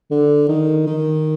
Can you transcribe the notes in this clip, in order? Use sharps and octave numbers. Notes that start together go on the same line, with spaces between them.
D3
D#3
D#3